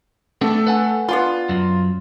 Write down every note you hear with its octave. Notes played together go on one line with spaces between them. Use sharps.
A3 B3 C4 D4 A4
B4 F#5 G#5
B3 D4 F4 C6
F#2 F#3